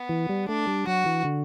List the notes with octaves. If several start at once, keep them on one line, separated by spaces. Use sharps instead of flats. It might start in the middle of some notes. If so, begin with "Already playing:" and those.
Already playing: B3
E3
G3
A3 D4
G3
F#3 F#4
E3
D3